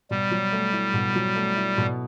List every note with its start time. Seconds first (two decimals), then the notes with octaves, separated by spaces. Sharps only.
0.11 B2 G3
0.31 F#3
0.53 A3
0.73 E4
0.94 B2
1.16 F#3
1.36 A3
1.56 E4
1.78 B2